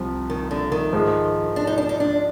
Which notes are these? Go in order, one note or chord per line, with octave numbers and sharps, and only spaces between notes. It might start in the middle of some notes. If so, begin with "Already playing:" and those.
Already playing: C2 C3 F3
D#3
D3
D#3
G#2 F3 G#3
D4
D#4
D4
D#4
D4